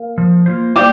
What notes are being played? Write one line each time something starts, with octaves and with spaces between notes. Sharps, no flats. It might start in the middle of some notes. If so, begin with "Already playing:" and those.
Already playing: A#3
F3
A#3 F4 C5
G3 A#3 G4